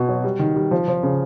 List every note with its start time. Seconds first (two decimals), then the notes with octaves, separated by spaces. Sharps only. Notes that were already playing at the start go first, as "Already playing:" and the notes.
Already playing: B2
0.09 F#3
0.24 G3
0.39 D#3
0.56 G3
0.71 F3
0.88 F3
1.03 C#3